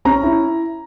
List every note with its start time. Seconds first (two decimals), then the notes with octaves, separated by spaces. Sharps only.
0.05 C#4 A#5
0.23 E4